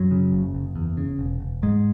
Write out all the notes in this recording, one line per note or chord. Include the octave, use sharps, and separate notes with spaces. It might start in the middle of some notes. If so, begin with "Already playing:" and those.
Already playing: F#2 F#3
C#3
F#1
F#1
E2
C#3
E1
E1
G#2 G#3